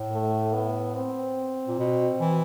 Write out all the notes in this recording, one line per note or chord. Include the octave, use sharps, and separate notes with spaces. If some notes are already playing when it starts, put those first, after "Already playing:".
Already playing: A2
A3
B3
C4
A#2
B2
E3